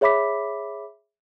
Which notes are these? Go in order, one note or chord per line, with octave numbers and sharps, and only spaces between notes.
G#4 C#5 E5 B5 D6 B6